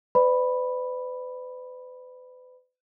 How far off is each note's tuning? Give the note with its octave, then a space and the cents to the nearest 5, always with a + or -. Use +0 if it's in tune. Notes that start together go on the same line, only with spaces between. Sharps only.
B4 +40 D5 +15 B5 +0